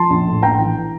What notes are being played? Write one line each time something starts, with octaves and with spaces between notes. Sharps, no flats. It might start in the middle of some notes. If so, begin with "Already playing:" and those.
Already playing: F3 A5 C6
A#1
A2
A#1 G5 A#5
E3